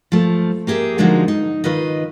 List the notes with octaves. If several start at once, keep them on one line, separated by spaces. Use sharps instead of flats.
F3 A3
A#3 G4 G#4 D#5 E5
D3 F3 G#3 A#3 D#4 F#4
D#4
D#3 F4 B4 D#5